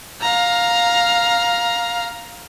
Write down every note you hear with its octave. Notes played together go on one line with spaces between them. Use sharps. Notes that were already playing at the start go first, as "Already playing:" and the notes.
F5 A#5